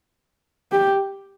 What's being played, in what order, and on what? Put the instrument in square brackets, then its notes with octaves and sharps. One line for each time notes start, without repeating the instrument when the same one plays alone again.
[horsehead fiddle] G4